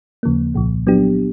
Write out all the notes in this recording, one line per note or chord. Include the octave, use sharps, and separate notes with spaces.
D#2 C#3 F3 A#3
C2 A#2 F3
F#3 B3 D4 G4